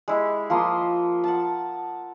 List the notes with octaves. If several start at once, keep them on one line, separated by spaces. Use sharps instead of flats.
G#3 E4 G4
F3 A#3 C6 D#6
F#5 A5